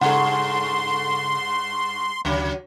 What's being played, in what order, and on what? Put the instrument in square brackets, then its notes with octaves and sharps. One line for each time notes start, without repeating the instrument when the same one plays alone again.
[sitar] G2 G#4 [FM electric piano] C#3 A4 [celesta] F#5 A#5 [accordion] C6
[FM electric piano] D2 [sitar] C#3 F#3